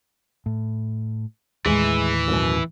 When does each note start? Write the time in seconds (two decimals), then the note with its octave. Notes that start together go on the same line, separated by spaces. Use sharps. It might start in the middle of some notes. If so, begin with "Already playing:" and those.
0.46 A2
1.66 D#2 A2 E3 G#3
2.28 F#2 B2